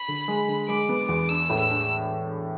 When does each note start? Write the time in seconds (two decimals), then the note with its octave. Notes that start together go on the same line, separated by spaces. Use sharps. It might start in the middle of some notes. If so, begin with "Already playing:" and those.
Already playing: B5
0.08 D3
0.28 G#3
0.48 D3
0.68 G#3 D6
0.89 B3
1.09 E2
1.29 D4 E6
1.50 A2
1.59 E6
1.70 D4